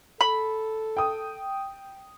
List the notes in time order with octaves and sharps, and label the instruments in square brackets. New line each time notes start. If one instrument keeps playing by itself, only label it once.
[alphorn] A4 [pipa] B5
[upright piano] G5 D#6